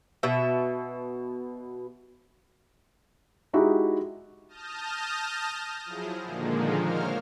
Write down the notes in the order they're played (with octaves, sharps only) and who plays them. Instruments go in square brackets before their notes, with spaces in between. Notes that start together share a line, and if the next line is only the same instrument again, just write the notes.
[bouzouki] B2 E5
[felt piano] G#3 D#4 E4 F#4 G4
[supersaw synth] A5 D#6 F6 G6 A#6
F3 F#3 E4 G#4
A#2 D3 D#3 F3 G#3 A#3
A#4 C5 C#5 F5 F6